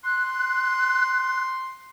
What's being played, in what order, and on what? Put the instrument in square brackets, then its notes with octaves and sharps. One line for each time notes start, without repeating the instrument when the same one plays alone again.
[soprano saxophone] C6 [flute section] F#6